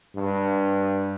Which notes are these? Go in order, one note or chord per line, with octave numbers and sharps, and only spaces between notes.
G2